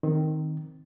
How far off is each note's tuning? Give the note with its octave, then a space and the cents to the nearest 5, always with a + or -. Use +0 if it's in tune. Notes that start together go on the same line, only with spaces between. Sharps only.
D#3 +0 C4 +0